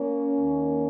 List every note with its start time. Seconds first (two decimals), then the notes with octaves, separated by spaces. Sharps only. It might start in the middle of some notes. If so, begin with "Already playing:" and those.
Already playing: A#3 C#4
0.38 D#2 D#3